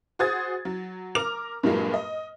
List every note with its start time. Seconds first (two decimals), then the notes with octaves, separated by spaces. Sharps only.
0.19 F#4 G#4 C5 D#6 G#6 A6
0.65 F#3
1.15 A#4 A#5 D6 F6 F7
1.63 G2 A#2 F#3 G#3 A#3
1.94 D#5